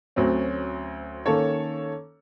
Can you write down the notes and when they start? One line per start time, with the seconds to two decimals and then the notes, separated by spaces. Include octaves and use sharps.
0.16 D2 F#3 C4 C#4
1.26 D#3 A#3 C#4 A4 C#5